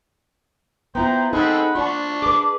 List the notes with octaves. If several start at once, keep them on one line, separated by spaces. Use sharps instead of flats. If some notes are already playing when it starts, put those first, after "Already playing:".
B3 E4 F4 C5 G5 A#5
C4 D#4 G#4 A4 F#5 B5
D4 F4 D5 C#6
G#4 B4 D6